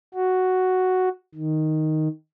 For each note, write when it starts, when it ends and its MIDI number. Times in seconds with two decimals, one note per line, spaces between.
0.14 1.09 66
1.35 2.08 51